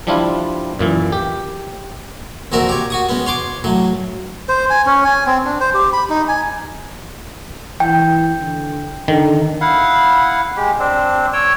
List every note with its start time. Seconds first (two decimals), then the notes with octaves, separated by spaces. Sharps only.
0.07 F3 G3 D4 E4 F4
0.79 F#2 A#2 E3
1.12 G4
2.52 F2 A#2 F3 F#4 A#4 E5
2.69 G4 C#5
2.90 F#4 C#6 D#6
3.09 G#3 B3 C#4
3.26 C#5 C6 D6
3.64 A2 F#3
4.49 C5
4.70 G#5
4.86 C#4
5.04 G#5
5.27 C4
5.45 D4
5.60 C5
5.74 G4
5.93 B5
6.10 D#4
6.28 G#5
7.80 E3 G5
8.41 D3
9.08 D3 D#3
9.61 E4 F5 F#5
10.56 G#3 G4
10.79 C4 D4
11.33 C#5 G5 E6